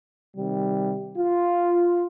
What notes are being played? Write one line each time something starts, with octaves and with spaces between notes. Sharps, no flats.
C3 D#3 G3
F4